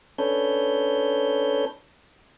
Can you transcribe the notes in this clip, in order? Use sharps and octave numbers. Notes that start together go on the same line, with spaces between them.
C#4 D4 A4 B4 C#5 G6